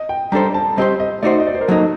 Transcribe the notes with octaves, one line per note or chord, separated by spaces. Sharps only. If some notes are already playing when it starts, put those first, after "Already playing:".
Already playing: D#5
G5
G3 D4 A4 C5 A#5
A5
G3 C4 G4 C5 D#5
D#5
A3 D#4 F#4 C5 D5
D#5
D5
C5
A#4
F#3 A#3 D#4 A4